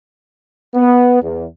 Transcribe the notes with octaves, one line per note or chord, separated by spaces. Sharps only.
B3
E2